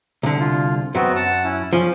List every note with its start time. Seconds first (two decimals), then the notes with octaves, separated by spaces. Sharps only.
0.23 C2 D3
0.39 F4
0.95 F#2 F#3 B3 C4 F#4
1.16 F#5 A5
1.44 C#4 E4
1.73 F3 C#4